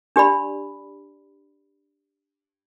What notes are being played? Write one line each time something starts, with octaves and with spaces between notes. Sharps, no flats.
D4 G4 D5 B5